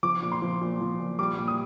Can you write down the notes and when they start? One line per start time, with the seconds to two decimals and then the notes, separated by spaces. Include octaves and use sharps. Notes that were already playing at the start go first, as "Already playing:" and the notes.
0.03 F3 D6
0.22 A#2
0.32 C6
0.42 F3
0.61 A#2
0.81 F3
0.99 A#2
1.19 G3 D6
1.38 A#2
1.48 D#6